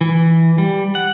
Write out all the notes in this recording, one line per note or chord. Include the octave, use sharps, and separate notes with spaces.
E3
G3
F#5